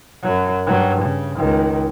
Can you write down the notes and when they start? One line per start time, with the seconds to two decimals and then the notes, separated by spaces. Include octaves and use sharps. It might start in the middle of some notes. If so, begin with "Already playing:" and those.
0.23 F#2 F#3
0.67 G2 F#3
1.02 C#3
1.36 C#2 D#3